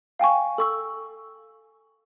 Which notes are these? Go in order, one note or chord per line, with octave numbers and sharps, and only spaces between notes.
F5 G5 G#5 C#6
A4 C#6 E6